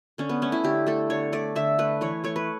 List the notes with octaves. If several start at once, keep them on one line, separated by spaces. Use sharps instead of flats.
D3 C#4
B3
A3 C#4
E4
D3 G4
A3 A4
D3 C#5
A3 D5
D3 E5
A3 B4
E3 C#5
A3 C#5
B4